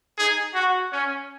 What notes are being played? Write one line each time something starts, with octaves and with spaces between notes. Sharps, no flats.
D#4 G#4
F#4
C#4